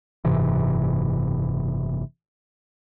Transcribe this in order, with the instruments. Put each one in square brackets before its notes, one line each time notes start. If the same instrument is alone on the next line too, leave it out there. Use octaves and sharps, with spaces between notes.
[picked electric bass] F#1 G#2 C3 E3